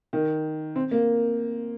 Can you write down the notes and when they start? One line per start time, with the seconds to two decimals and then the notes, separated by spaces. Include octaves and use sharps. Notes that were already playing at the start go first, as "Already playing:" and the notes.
0.13 D#3
0.76 C4
0.91 A#3